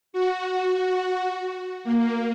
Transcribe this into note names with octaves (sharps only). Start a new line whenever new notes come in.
F#4
A#3